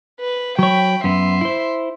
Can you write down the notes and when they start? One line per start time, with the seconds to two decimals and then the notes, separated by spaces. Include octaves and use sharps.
0.20 B4
0.59 F#3 C#5 G5 B5
1.04 F#2 B3 E5 C6
1.41 E4 C5